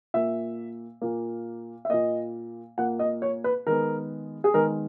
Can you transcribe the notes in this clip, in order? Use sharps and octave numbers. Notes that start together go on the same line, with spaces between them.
A#2 A#3 E5
A#2 A#3
E5
A#2 A#3 D#5
A#2 A#3 F#5
D#5
C#5
B4
D#3 G#3 B3 A#4
G#4
D#3 G#3 B3 A#4